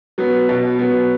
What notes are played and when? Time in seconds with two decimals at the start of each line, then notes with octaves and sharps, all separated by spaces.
0.18 F#3 B3
0.49 B2
0.79 F#3 B3